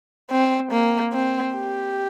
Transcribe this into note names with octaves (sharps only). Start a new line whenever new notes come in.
C4
A#3
C4
G4